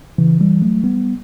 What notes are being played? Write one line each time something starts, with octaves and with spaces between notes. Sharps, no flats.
C#3 E3
E3 G3
F#3 A3
G3 B3